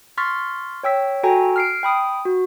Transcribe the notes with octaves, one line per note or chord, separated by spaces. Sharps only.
C6 C#6 F6 A6 B6
C#5 G5 E6 B6
F#4 A4 G5 G#5 A#5
F6 C7 D7
G5 B5 D#6
F#4